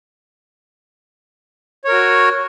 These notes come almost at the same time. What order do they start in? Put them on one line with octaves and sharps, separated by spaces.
C#5 A#4 F#4